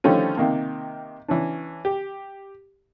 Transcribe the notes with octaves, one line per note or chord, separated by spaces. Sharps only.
D3 D#3 F3 G3 A3 C#4
C3 D#3 A#3
E3 C#4 D4
G4